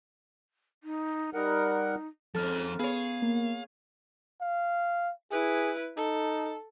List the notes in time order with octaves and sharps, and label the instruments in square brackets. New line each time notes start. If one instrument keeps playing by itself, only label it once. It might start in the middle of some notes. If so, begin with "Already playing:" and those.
[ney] D#4
[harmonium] G3 A#4 F#5 [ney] D#4
[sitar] F2 G#2 [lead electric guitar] F3 C4 [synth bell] A4 F6
[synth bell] B3 [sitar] G#4 C#5 [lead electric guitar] F5
[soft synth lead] A#3
[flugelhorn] F5
[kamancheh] E4 B4 [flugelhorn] G#4
[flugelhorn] D#4 [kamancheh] A4